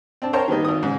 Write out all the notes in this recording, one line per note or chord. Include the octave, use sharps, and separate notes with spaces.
C4 D4 A5
A#4 C5 C#5 G5 A5 A#5
D#3 G3 A#3 B3 D#4
G#1 D#4 D#6
G#2 C#3